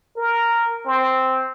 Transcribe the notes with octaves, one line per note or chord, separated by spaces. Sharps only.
A#4
C4